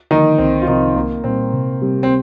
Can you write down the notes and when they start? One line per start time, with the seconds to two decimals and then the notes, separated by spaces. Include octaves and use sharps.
0.11 D3 D#3 F3 A#3 D#4
0.38 C2 C4
0.62 F4
0.67 C3 D#3 F3 C4 D#4
0.95 C2 A#3
1.24 A#2 G3 C4
1.53 C3
1.82 G3 C4 G4
2.03 C4